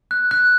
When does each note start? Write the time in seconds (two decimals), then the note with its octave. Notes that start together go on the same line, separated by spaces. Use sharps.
0.11 F#6
0.31 F#6